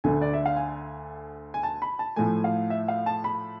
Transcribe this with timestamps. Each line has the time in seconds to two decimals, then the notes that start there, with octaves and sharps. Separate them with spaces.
0.04 D2 D3 A3 G#5
0.21 D5
0.33 E5
0.46 F5
0.56 G#5
1.54 G#5
1.63 A5
1.82 B5
1.99 A5
2.16 A2 F3 A3 G#5
2.44 F5
2.70 E5
2.88 F5
3.06 A5
3.24 B5